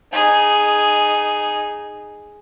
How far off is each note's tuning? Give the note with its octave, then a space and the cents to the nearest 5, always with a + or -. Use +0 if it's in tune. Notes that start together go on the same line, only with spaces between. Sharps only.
D#4 -15 G#4 +0